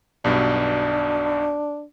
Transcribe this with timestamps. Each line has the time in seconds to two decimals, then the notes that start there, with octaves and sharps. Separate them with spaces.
0.24 B1 G2 B2 D4